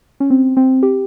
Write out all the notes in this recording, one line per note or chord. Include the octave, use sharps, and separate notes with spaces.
C#4
C4
C4
G4